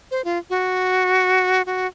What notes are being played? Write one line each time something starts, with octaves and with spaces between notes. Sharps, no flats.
C5
F4
F#4
F#4